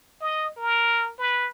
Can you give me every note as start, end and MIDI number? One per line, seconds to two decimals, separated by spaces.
0.21 0.51 75
0.57 1.11 70
1.19 1.47 71